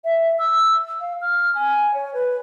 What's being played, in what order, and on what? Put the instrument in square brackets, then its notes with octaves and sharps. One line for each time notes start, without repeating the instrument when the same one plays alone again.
[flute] E5
E6
F5
F6
G#5
C#5
B4